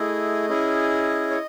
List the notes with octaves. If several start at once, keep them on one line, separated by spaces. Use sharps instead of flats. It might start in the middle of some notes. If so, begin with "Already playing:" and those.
Already playing: A3 E4 G#4 D#5
C#4 E4 G#4
C#5